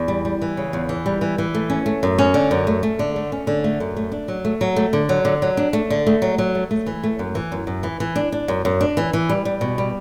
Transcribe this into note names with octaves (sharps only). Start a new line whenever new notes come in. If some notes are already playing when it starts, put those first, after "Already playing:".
Already playing: E2
G3
G3
E3
C#3
E2
E3
G3
E3
E3
A3
C#4
A3
F#2
C#4
D3
F#2
A3
A3
D3
A3
C#4
D3
A3
F#2
A3
D4
F#3
A3
F#3
A3
D3
F#3
D3
F#3
D4
A3
D3
A3
F#3
F#3
A3
A3
E3
A3
F#2
E3
F#2
F#2
E3
E3
D4
D4
F#2
F#2
D4
E3
E3
G3
G3
B2
G3